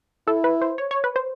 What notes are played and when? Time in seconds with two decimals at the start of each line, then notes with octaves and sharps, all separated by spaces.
0.27 E4 A4
0.44 B4
0.62 C5
0.78 C#5
0.91 C#5
1.04 B4
1.16 C5